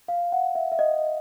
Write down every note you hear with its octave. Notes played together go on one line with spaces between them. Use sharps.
F5
F#5
E5
E5
D#5